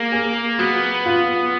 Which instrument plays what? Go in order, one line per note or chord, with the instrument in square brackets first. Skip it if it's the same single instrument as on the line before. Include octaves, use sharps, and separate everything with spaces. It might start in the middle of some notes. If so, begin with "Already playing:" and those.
Already playing: [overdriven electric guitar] A#3 [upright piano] G#4
[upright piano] G#4
[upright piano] F#3 [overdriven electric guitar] B3
[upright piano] F4